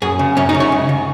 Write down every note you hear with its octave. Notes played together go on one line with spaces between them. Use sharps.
F#2 G#4
C#3
F#2 C#4
D#4
C#3
C#5
C#2
C#3